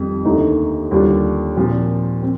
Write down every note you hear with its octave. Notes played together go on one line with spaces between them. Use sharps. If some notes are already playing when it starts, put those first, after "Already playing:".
Already playing: F2 D#3 G3
D#2 D3 A3 D#4
D#2 D3 G3 D4 F4
A#2 F3 C4
C4